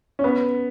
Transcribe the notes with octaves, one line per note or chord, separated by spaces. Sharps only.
C#4
B3